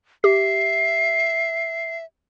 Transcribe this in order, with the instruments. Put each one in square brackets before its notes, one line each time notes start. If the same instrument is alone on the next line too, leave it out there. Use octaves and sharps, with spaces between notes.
[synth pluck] G4 [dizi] E5 [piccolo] C7